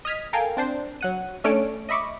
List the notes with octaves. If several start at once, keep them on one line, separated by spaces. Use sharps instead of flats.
D#5 D#6 F6 G#6 B6
A4 A#4 F5 G5 G#5
C4 D4 C5
F#3 F#5 D#7
A3 C#4 D4 A4 C#5 D7
D#5 E5 B5 C#6 D6